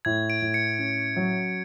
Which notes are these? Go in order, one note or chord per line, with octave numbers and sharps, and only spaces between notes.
A2 G#6
D7
A2
C#7
C#4
F#3